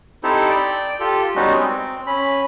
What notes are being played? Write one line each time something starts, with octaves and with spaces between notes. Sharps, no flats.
C4 D#4 E4 G4 A4 C5
D5 G5
F4 G4 A4
G3 G#3 B3 C#4 D#4 F#4
C4
C#4 B5